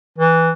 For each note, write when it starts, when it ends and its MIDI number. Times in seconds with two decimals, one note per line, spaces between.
0.18 0.51 52